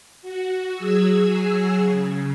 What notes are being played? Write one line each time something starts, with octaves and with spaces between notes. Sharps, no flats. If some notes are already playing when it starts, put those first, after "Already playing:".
F#4
F#3 G#4 G#5 E6
C#3